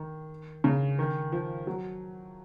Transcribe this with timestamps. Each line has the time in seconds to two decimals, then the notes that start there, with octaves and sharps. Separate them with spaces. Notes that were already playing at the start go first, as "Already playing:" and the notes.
Already playing: D#3
0.64 C#3
0.99 D#3
1.32 F3
1.67 F#3